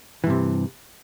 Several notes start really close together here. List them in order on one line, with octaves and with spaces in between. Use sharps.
E3 G2 C3